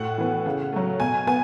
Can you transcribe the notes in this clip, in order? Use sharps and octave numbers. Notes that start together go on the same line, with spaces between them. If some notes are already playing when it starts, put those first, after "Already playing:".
Already playing: A2 F#5
E3 B3
C#3
F#3 A3
B2 G#5
B3 G#5